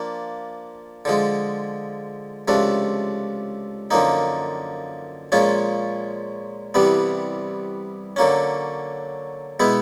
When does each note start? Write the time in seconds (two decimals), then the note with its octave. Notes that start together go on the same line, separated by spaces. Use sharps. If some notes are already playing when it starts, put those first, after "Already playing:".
Already playing: F3 A#3 D4
1.05 D3 F3 G#3
2.48 C#2 C3 F3 A3 D4
3.91 F#2 D3 F3 A#3 D#4
5.32 A#2 F3 G#3 C#4 F4
6.74 C2 C3 E3 G3 B3
8.16 D3 F#3 A#3 C#4
9.60 B2 G#3 B3 E4